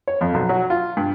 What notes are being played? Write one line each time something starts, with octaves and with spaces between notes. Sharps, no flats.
C#5
F2
B1
F#3
F4
G2